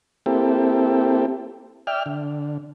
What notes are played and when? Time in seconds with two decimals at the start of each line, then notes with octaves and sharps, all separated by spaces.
0.26 A#3 C4 E4 G4 A4
1.87 D5 E5 G5 F6
2.06 D3